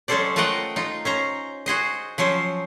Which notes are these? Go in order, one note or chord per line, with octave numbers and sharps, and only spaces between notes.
F#3 G#3 C#4 A4 C5 D5
A3 F4 A#4 D#5 F#5 G5
D#4 F4
C#4 C5 A#5
F#4 G#4 C5 D#5
F3 F#3 C#4 C5